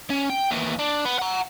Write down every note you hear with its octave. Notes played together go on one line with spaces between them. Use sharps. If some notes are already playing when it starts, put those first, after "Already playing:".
C#4
G5
D#2 E3
D4
B3
F#5 A#5